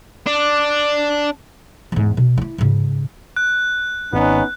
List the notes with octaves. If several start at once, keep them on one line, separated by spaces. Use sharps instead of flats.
D4
E2 G#2
B2
C#4 E4
G#2 C#3
F#6
G#1 B3 C#4 D#4